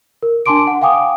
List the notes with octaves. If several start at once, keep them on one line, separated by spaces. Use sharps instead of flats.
A#4
D4 G#5 A5 C6 D6 D7
F#5
F5 G5 G#5 D6 D#6